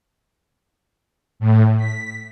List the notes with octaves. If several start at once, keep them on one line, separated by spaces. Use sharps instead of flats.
A2
B6